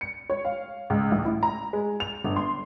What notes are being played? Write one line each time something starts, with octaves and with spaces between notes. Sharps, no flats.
C#7
C#5
F5
C#2
A1
E4
A#5
G#3
F7
G1
C6